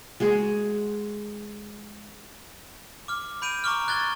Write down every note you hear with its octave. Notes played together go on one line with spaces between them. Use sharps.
G#3 F#4 G#4
D6 F6
B5 G6 D7 D#7 F7
A#5 C#6 D6 F6
F#6 G#6 A6 G7